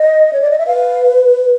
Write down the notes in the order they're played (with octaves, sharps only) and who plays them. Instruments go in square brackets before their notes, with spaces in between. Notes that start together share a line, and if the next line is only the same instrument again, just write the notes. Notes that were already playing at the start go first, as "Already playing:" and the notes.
Already playing: [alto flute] D#5
C#5
D5
D#5
E5
[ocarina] B4 [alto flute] F5